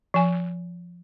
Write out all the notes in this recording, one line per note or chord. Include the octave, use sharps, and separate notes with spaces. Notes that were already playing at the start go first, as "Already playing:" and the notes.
F3 G#5